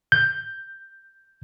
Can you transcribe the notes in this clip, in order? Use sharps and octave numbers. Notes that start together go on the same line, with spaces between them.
G6